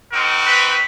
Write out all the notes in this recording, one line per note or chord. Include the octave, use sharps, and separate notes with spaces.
C4 D#4 F#4 A#4
B4